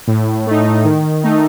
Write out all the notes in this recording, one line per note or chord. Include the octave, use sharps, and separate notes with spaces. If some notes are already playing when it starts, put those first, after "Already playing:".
A2
A3 D#4
D#3
A3 D#4